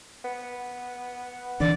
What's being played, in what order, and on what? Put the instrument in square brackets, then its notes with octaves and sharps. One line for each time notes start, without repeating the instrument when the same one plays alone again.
[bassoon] B3
[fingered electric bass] D3 E3 D4 [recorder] D5